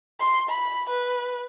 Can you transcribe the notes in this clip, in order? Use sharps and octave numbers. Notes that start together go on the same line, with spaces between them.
C6
B5
B4